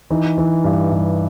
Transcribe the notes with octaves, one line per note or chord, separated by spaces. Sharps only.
E3 D#4
E3
G2
G2